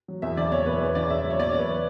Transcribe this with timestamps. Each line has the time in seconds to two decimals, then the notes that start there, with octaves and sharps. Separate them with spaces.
0.08 F#3
0.22 E2 E5
0.37 C#3 D5
0.52 E2 C#5
0.66 E2 B4
0.81 E2 C#5
0.95 C#3 D5
1.10 C#3 E5
1.25 F#3
1.30 C#5
1.39 B2 D5
1.49 C#5
1.54 E2
1.59 B4